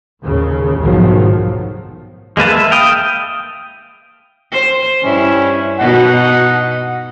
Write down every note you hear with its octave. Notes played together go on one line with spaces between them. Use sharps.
D#2 A#2 C#3
F1 B1 G#2 D#3 F3 F#3
G#3 A#3 B4 A5
E5
F5 G5 D#6
C5
G2 C#4 E4
B2 D#4 F#5